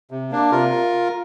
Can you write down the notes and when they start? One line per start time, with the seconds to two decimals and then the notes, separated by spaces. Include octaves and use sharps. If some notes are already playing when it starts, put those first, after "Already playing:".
0.11 C3
0.31 A#3 D4
0.51 C3 F4 A#4